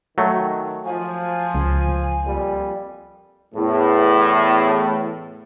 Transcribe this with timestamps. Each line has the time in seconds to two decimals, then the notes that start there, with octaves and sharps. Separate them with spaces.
0.18 D#3 F#3 A3
0.85 F3 G#5
1.54 C#2
2.24 F2 A#2 G3
3.55 E2 A2